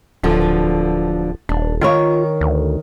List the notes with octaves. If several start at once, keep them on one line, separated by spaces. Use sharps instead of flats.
D1 D3 F3 B3
D#1 D4
D#3 F4 A#4 C#5
D2